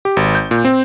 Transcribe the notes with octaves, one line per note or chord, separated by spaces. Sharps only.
G4
G#1
G6
A#2
C4